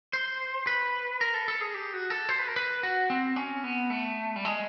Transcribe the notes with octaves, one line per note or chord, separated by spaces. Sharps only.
C5
B4
A#4
A4
A4
G#4
G4
F#4
A4
C5
B4
A#4
B4
F#4
C4
C#4
B3
A3
G3
G#3